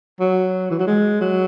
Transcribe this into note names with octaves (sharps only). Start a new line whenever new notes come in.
F#3
E3
F#3
G#3
F#3